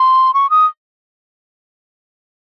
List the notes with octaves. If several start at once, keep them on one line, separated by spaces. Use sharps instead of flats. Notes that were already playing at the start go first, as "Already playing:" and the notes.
Already playing: C6
C#6
D#6